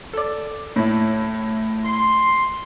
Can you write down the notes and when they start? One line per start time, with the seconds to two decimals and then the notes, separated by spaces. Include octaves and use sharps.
0.13 A4 D5
0.76 A2 E4
1.85 C6